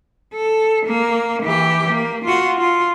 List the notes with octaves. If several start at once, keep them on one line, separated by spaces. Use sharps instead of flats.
A4
A#3
E3 G4
A#3
F4 F#4
F4